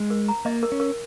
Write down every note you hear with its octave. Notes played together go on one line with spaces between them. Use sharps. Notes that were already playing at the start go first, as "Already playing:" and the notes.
Already playing: G#3
A#4
A#5
A#3 D#5
A#4
C#4
A#4